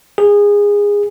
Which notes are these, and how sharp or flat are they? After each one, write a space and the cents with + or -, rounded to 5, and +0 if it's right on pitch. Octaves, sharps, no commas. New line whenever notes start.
G#4 -20